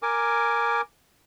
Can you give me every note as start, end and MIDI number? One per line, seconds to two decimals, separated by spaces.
0.02 0.81 70
0.02 0.81 80
0.02 0.81 86